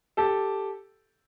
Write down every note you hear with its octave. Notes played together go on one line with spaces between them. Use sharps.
G4 A4